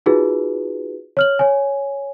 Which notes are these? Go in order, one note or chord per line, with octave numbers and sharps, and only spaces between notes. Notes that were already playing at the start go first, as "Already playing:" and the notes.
D#4 F4 F#4 G#4 B4
C#5 F6 F#7
C#5 G#5